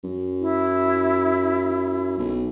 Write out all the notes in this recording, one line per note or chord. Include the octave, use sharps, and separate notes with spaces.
F#2
E4
B1